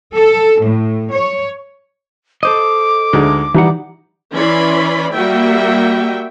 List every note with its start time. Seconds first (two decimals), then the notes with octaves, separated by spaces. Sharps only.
0.14 A4
0.61 A2
1.11 C#5
2.43 A4 C5 D#5 D6
3.13 D2 G#3 D#4
3.54 E3 G3 D#4 F#5
4.33 E3 C#4 D5 B5 C6
5.13 G3 A#3 F#4 E5 G5